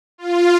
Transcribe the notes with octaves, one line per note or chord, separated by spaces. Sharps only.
F4